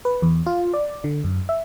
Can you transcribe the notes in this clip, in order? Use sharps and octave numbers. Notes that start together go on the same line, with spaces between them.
B4
E2
F4
D5
D3
F#2
E5